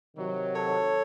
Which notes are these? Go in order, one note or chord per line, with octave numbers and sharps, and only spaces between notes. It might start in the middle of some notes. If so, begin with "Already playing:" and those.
C3 D#3 F#3
A4 C#5